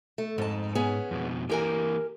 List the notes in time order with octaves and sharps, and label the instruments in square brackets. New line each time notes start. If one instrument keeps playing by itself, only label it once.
[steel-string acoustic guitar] A3
[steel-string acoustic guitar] F2 A5 [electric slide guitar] G#2
[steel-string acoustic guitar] B3 C#4 G#4
[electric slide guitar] F2 B2
[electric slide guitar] E3 A#3 [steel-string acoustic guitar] G4 A#4 G#5